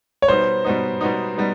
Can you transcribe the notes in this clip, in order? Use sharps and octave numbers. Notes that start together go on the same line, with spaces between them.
C#5
B2 G3 B3 D#4 C5
B2 G3 B3 D#4
B2 G3 B3 D#4
G3 B3 D#4